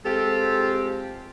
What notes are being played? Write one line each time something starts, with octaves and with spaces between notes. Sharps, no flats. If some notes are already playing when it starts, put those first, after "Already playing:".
G#3 C4 F4 G4 A4